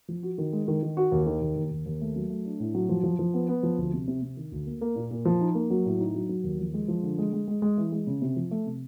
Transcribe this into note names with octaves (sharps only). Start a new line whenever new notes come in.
F3
F#4
D#3
G#3
D#3
D#3
F#4
D#2
D#3
D#2
D#2
D#2
D#2
A3
F#3
A3
D4
A2
F#3
F3
F3
F3
B3
B3
F3
D2
C3
C3
C3
D#3
D2
A#3
A#3
A#2
A#2
F3
D#4
A#3
F#3
A2
D#4
F#3
F#3
D#2
F3
G#3
F3
D3
G#3
G#3
G#3
G#3
E3
G#3
C#3
C3
F3
A3
C3